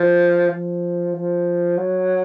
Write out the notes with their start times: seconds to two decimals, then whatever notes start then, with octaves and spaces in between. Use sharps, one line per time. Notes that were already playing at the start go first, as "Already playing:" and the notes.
Already playing: F3
0.50 F3
1.15 F3
1.78 F#3